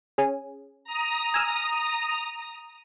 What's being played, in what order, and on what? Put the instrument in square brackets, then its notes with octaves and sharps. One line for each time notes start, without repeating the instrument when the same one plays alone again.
[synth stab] C#4 G#4
[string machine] A#5 D#6
[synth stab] G#5 E6 F6